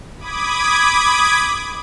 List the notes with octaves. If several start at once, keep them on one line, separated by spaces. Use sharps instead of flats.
B5 D6 D#6 G#6